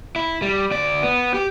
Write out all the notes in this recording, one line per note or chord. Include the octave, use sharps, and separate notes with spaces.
E4
G3
D2 D5
B3
G4